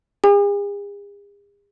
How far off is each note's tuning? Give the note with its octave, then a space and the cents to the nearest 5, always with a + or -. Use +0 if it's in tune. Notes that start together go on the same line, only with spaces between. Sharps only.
G#4 -45 G#5 -45